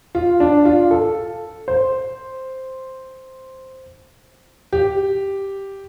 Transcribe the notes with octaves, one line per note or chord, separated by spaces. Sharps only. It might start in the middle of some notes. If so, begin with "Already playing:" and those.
F4
D4
F4
A4
C5
G4